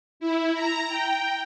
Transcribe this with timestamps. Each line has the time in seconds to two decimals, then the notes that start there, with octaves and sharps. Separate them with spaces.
0.20 E4
0.55 A#5
0.89 G5